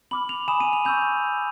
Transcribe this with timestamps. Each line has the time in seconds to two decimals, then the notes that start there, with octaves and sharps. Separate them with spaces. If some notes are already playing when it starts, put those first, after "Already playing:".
0.11 B5 D6 F6 F#7
0.29 F7
0.48 G#5 B5 D#6 E7
0.60 D#7
0.73 F7
0.85 C#6 E6 G6 F7